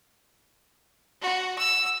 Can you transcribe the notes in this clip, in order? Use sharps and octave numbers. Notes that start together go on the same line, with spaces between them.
F#4
E6